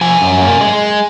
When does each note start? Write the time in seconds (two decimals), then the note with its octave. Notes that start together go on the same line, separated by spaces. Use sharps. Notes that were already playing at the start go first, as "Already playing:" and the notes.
0.01 F3 G#5
0.21 F#2
0.41 A#3
0.61 G#3